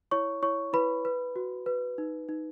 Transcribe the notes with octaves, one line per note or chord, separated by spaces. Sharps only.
E4 C#5 C#6
E4 C#5 C#6
E4 B4 B5
B4
F#4
B4
D#4
D#4